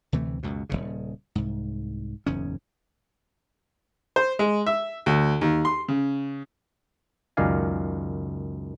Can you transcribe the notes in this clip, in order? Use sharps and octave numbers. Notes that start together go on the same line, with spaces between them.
D2 C3 E3 A3
C#2 F#2 B2
D#1 G#1 C#3
C2 G#2
F#1 E2 G#2 C#4
C5
G#3
E5
D2
D#2
C6
C#3
C#2 F#2 D#3 D5 F5 G#5